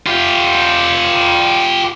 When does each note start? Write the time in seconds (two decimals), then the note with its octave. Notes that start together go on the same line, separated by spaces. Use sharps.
0.06 F4 G4